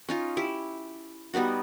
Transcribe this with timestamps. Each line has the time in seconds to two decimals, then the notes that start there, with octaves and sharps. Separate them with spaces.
0.09 C#4 D#4 F4
0.37 E4 G4
1.34 G3 B3 D#4 F#4